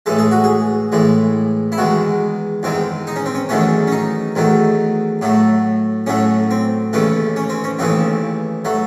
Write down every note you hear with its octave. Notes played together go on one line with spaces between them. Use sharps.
A2 E3 G#3 A4
G#4
F#4
G#4
A2 E3 G#3
E4
E2 D#3 G#3 F#4
E2 D#3 G#3 C4
D#4
C#4
C4
C#4
E2 D#3 F#3 A3 C#4
C#4
D#4
E2 D#3 F#3 A3
A2 F#3 A3
A2 F#3 A3 C#4
C4
D#2 C#3 E3 A3 C#4
C#4
C4
C#4
D#2 C#3 E3 A3 C4
F#3 A3